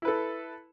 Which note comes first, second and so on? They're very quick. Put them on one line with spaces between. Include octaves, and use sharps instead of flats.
E4 B4 A4